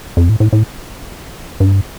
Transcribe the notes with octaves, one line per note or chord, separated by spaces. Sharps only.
F2
A2
A2
A2
G2